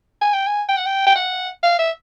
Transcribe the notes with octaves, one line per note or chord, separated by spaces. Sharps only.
G#5
G5
G#5
G5
F#5
G5
G5
F#5
F5
E5